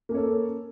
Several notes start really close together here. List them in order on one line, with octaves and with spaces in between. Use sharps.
A#3 C#4 C#5 A4